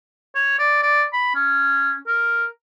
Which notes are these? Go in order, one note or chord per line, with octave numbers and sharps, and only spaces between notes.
C#5
D5
D5
B5
C#4
A#4